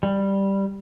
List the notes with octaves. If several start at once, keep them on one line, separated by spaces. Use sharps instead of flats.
G3